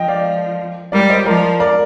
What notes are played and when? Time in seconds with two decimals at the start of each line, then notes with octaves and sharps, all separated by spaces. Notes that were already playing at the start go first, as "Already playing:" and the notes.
Already playing: F3 D#5 G5
0.08 D5 F5
0.92 G3 A#4 D5
1.09 C5 D#5
1.26 F3 A#4 D5
1.60 A#4 D5